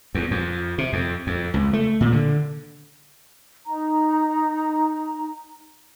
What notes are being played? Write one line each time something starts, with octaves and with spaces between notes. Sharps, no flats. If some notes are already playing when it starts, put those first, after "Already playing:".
E2
F2
C3
F2
F2
C#2
A3
A#2
D3
D#4 A#5